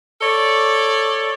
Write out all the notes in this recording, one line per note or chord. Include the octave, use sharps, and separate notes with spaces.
A4 C#5 D5